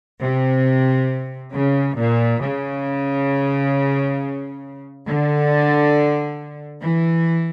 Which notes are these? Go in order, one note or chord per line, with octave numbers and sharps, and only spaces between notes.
C3
C#3
A#2
C#3
D3
E3